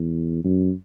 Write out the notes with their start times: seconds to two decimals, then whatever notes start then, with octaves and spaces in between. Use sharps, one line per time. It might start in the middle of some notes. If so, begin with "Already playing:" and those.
Already playing: E2
0.44 F#2